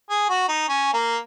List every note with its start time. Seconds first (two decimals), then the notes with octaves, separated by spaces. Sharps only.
0.10 G#4
0.29 F#4
0.48 D#4
0.68 C#4
0.93 A#3